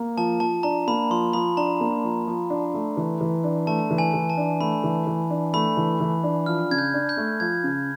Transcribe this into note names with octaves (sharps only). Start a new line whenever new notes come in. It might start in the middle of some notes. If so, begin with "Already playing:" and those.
Already playing: A#3
F3 A5
F3 A5
D4 A#5
A#3 B5
F3 C6
F3 B5
D4 A#5
A#3
F3
F3
D4
A3
E3
E3
D4
A3 A5
E3
G#5
E3
A5
D4
A3 B5
E3
E3
D4
A3 B5
E3
E3
D4
F3 F6
C#3 G#6
G6
D4
G6
A3
F3 G#6
C#3